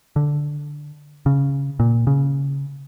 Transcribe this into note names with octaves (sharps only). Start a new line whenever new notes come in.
D3
C#3
A#2
C#3